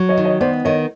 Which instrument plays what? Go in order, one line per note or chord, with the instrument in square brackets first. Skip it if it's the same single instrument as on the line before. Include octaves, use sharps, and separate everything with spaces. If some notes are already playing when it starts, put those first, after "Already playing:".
Already playing: [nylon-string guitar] F#3
[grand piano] C#5 D#5
[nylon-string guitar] D#3
[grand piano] C#5 D#5
[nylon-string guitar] B3 [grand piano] C5 D5
[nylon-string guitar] D#3 [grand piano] C#5 D#5